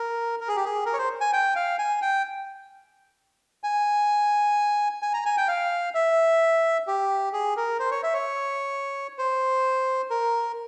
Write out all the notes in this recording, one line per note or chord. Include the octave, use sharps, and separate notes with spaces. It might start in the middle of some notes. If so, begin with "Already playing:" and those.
Already playing: A#4
A#4
G#4
G4
G#4
A#4
C#5
C5
G#5
G5
F5
G#5
G5
G#5
G#5
A#5
G#5
G5
F5
E5
G4
G#4
A#4
C5
C#5
E5
C#5
C5
A#4